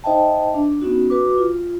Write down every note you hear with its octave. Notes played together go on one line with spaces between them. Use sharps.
D#4 C5 D#5 E5 G5 A5
D4
B3 C#4 D#4 F#4
F#4 B4 D6
F4